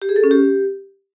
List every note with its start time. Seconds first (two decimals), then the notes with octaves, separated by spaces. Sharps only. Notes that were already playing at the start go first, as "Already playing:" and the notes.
0.02 G4
0.09 G#4
0.16 A4
0.24 C#4
0.31 G4